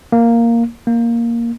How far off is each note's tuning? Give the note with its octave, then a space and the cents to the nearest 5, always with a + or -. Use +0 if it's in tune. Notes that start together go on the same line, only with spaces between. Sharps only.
A#3 -5
A#3 +0